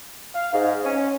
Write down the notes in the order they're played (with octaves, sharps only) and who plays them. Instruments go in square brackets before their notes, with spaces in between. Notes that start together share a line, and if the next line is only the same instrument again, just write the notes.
[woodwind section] F5
G#2
C#4